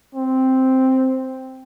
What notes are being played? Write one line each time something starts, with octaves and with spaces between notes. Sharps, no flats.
C4